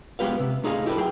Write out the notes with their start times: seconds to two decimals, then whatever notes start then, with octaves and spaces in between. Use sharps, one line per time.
0.19 G#3 B3 G4 B4 F5
0.39 C3
0.64 A3 D#4 G#4 D#5 F5
0.86 E4 G4 A4 B4
0.97 F#2 G#4 G5